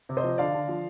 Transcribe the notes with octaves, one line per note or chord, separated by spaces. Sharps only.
C3
C5 D#5
F3
D3 D5 F5
D3
F3